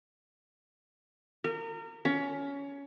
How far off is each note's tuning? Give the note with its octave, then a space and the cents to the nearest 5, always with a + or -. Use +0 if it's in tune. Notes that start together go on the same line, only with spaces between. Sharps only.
A#4 -30
C#4 +20